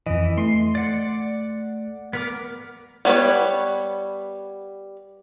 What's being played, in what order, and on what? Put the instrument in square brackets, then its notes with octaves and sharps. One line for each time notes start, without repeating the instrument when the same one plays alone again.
[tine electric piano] F2 D#5 [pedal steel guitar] E3
[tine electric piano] A3 [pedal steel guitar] C6
[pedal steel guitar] D5 F#5
B3 A#4 D6
[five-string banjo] G3 B3 B4 C#5